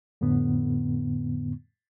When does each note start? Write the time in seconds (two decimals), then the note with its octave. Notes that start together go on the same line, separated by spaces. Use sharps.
0.21 F2 A2 D3 B3